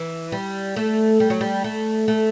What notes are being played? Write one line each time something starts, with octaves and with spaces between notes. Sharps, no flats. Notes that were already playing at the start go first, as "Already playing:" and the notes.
Already playing: E3
G3
A3
G3
F#3
G3
A3
A3